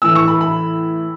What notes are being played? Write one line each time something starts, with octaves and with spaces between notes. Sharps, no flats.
A2 E3 E6
C#6
B5
B5